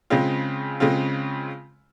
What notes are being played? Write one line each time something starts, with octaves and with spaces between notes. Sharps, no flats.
C#3 G#3 C4 F4
C#3 G#3 C4 F4